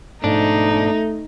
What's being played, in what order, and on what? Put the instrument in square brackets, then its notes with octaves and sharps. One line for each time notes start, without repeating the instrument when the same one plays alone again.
[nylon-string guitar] G#2 B2 F3 [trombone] A3 [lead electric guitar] D4 [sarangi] D#4